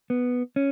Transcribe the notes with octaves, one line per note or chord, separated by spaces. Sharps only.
B3
C#4